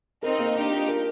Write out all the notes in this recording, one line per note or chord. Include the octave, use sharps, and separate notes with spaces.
C4 D#4 A#4
A#3
D4 D#4 G4
F4
A#4